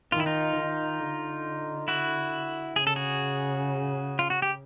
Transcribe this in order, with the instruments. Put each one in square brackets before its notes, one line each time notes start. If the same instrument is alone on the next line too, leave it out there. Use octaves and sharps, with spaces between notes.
[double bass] D#3 [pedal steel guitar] F4
[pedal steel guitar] E4
D#4 F4
[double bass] D#3
D3
[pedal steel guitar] E4 F#4
[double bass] C#3 [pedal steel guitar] G#4
[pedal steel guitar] A4
F#4 G#4
F4
F#4
G4